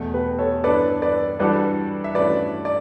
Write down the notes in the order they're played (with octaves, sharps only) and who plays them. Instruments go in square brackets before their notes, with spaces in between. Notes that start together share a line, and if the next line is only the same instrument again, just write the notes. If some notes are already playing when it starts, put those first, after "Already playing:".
Already playing: [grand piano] E2 B2 A3
[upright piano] G4 B4
A4 C#5
[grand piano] G2 E3 B3 D4 A4 [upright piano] B4 D5
[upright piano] B4 D5
[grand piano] E3 G3 D4 F#4 A4 [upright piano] B4 D5
[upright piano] E5
[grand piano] G2 E3 A3 C#4 F#4 [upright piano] B4 D5
[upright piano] D5